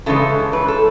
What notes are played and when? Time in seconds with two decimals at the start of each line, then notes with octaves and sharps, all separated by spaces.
0.06 C#3 E3 G#3 A4
0.53 B4
0.68 A4